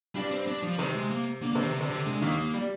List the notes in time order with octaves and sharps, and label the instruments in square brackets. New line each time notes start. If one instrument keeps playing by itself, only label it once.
[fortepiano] G2 G3 [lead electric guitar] D4
[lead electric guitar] C4
D4
F3
[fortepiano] C3 [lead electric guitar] D#3
[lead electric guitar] G#3
A#3
[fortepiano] D3 [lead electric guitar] A#3
[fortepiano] C3 [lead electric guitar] A#3
[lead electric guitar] D#3
D3
[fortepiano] C3
[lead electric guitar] D3
[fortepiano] D3 [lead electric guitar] G#3
[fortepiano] D#2 D#3 [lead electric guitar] A#3
[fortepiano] G3